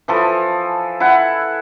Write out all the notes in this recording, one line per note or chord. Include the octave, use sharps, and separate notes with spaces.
E3 F3 A4
E4 F#5